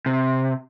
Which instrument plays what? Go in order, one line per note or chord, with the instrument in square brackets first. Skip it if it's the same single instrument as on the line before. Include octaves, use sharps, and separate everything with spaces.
[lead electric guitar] C3